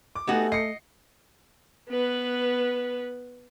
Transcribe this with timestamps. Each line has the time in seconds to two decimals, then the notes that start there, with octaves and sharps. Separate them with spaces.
0.15 D6
0.27 A3 B3 D#4 F#4 G4 F#5 G#5
0.52 D#5 C7 C#7
1.89 B3 B4